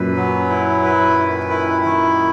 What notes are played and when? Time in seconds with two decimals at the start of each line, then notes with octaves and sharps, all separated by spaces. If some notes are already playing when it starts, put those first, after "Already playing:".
Already playing: F#2 A#2 B4
0.16 F#3
0.49 E4
0.83 B4
1.17 D#3
1.50 E4
1.85 D#3